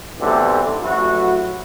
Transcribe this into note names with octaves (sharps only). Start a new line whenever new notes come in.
B1 A2 D3 E3 G3 C4
A1 F#3 E4 F#4